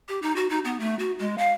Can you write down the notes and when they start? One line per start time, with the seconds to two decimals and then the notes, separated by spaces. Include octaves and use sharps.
0.08 G4
0.22 D#4
0.36 F#4
0.50 D#4
0.65 B3
0.80 A3
0.99 F#4
1.19 G#3
1.38 F5